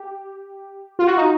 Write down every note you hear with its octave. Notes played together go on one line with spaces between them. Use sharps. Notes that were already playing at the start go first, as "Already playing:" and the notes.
Already playing: G4
F4
F#4
D#4